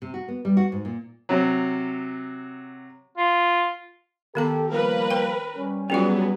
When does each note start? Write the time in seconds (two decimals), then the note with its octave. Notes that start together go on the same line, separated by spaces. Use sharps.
0.02 C3
0.14 F#4
0.28 B3
0.45 G3
0.57 F#4
0.72 G#2
0.85 A#2
1.29 C3 F#3
3.17 F4
4.35 D#3 B3 G4 A4 A#5
4.70 F3 G3 A#3 A#4 B4
5.10 C5 G5
5.57 G3 C#4
5.90 F#3 G3 B3 C#4 F4 F#4 G#4